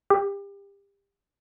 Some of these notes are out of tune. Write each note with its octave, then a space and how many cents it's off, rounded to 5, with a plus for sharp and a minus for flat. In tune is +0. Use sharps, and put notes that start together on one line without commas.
G4 +30